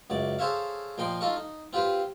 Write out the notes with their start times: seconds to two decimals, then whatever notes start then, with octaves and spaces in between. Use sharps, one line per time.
0.10 C#2 F#2 D5 D6
0.39 G#4 A4 C5 C#5 E5 F5
0.98 A#2 F3 D#5 G5 C6
1.21 D#4 F4 A4 D#5 F5 C#6
1.36 D#4
1.73 C4 F4 G4 B4 C5